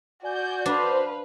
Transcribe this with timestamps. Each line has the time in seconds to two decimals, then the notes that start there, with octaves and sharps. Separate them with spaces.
0.23 F#4 D5 G#5 G6
0.66 D4 B4 C5 F5